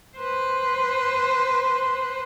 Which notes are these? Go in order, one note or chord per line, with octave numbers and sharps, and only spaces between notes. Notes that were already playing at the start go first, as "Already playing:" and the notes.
B4 C5